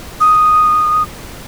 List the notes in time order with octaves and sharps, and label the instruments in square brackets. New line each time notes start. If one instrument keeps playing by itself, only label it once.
[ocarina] D#6